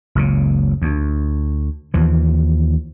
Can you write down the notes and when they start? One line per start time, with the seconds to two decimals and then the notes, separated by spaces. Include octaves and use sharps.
0.15 F#1 C#2 C#3
0.82 D2
1.94 D#2 E3 F3